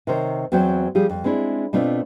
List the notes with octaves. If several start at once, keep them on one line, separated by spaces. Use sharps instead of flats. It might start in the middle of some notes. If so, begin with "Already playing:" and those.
C3 D#3 A#4 C5 C#5
E2 F#3 C4 F#4 C5 G5
F3 G3 G4 G#4
F2
G#3 C4 D4 E4
B2 A3 C4 D4 F4